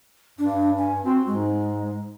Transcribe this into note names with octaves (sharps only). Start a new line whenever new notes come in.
G2 D4
G#5
C4 F#4
G#2 G#3